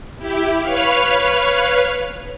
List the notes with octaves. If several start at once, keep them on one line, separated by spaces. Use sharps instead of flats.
E4 G4
B4 C#5 F5 F6